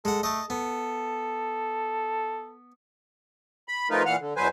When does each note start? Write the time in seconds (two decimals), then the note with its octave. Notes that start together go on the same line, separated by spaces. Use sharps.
0.05 G#3 A4 F#5
0.23 A3 D#5 A5
0.50 B3 A4
3.68 B5
3.90 F3 A3 D#4 F4 A#4 B4
4.06 A#2 E3 F5 F#5 F6
4.20 D3
4.37 E2 B2 F#3 B4 C5 G#5